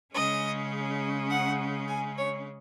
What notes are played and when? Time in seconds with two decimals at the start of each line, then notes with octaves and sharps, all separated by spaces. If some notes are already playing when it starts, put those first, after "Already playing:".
0.14 C#3 G#3 C#4 D#5
1.31 F#5
1.88 G#5
2.18 C#5